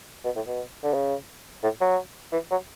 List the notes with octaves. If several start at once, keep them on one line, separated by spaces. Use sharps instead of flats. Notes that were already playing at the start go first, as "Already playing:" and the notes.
B2
A2
B2
D3
C#3
A2
F#3
E3
F#3